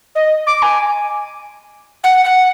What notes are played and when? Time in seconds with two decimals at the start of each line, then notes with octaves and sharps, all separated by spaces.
0.15 D#5
0.46 D6
0.62 G#5
2.03 F#5
2.24 F#5